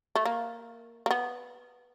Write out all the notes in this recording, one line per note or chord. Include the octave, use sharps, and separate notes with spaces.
A3
A#3
A#3
B3